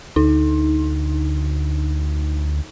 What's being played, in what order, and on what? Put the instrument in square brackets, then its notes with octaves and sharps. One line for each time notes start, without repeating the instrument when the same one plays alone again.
[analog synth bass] D2 [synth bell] D#4